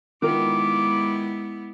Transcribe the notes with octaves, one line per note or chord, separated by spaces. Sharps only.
D#3 G#3 B3 E4 F4 A#4 D6